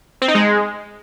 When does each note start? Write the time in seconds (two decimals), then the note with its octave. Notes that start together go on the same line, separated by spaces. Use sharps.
0.22 C4
0.28 D#4
0.35 G#3